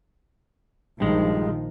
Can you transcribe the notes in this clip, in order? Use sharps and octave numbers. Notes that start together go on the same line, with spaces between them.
A#1 G2 D#3 F3 G#3